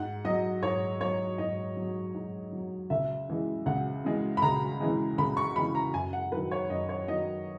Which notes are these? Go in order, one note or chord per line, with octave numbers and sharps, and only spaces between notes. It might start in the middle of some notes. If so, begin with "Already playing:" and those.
Already playing: G#2 F#5
F#3 D#5
G#2 C#5
F#3 C#5
G#2 D#5
F#3
G#2
F#3
C#2 E5
C#3 E3 G#3
C#2 F#5
C#3 E3 G#3
B5
C#2 A#5
C#3 E3 G#3
C#2 B5
C#6
C#3 E3 G#3 B5
A#5
F#2 G#5
F#5
D#3 F#3 B4
C#5
F#2 D#5
C#5
D#3 F#3 D#5